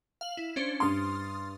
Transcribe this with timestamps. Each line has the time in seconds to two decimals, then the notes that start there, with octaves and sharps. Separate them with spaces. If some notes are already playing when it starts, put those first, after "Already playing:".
0.21 F5 F#7
0.37 E4
0.56 C#4 D4 C5
0.80 G2 C6 D#6 F6 A6